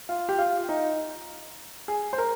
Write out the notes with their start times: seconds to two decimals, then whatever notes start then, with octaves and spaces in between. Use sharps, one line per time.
0.09 F4
0.29 G4
0.39 F4
0.69 D#4
1.88 G#4
2.13 C5
2.18 A#4